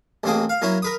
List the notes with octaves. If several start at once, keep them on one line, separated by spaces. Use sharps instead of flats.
A1 B2 A#3 C4 G#4
F5
F#3 A#3 C#4 E4
A#4 B4 D#6